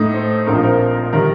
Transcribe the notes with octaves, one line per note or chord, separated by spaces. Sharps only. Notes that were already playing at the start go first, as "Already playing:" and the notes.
Already playing: A2 A3 D#4
C5
A#1 A#2 F3 C4 D#4 A#4
C5
A#4
D#3 G3 A#4